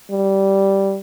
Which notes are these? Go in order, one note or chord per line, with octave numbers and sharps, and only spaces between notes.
G3